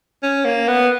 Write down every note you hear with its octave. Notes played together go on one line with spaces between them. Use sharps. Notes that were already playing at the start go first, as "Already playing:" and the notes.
C#4
A#3
B3